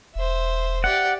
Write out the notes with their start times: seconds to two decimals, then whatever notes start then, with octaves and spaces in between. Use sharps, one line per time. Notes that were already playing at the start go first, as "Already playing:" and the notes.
0.15 E1 C5 E5
0.84 G4 D5 F#5